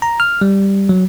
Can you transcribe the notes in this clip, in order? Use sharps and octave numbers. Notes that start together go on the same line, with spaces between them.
A#5
F6
G3
F#3